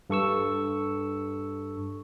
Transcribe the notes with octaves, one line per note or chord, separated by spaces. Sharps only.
G2 A4 C#6 E6